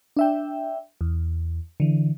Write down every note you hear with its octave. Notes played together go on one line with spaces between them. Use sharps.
D4 E5 G5
E2
D3 E3